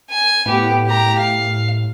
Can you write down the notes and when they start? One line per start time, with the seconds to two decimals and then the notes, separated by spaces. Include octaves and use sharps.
0.11 G#5
0.46 A2 B3 G4
0.87 G4 A#5
1.19 F5